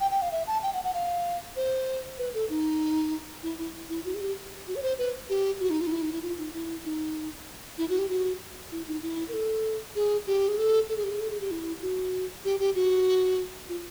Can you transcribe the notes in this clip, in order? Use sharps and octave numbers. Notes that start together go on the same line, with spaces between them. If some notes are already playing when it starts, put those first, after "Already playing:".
G5
G5
F5
E5
A5
G5
F#5
F#5
F5
C5
B4
A4
D#4
E4
E4
E4
F#4
G#4
G4
F#4
C#5
C5
B4
G4
F#4
D#4
F4
D#4
E4
D#4
E4
F4
D#4
E4
D#4
E4
F#4
G4
F#4
E4
D#4
E4
A#4
A4
G#4
G4
G#4
A4
A4
G#4
G4
G#4
A4
G#4
G4
E4
F#4
G4
G4
F#4
F4